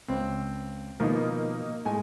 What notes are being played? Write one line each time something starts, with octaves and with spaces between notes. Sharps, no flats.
C#2 C4
B2 D#3 F3 A#3 D#4
A2 G#3 G#5